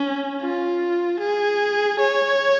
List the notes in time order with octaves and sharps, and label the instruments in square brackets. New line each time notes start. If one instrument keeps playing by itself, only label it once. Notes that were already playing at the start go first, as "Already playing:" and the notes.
Already playing: [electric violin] C#4
F4
G#4
C#5